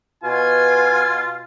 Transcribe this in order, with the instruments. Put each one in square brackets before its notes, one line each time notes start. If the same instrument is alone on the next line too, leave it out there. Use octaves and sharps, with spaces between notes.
[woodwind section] B2 [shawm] F4 [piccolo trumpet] G#5